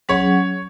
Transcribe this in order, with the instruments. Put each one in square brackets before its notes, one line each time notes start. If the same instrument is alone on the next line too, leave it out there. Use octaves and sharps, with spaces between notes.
[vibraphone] F#3 C#4 G#4 F#5 [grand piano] C#5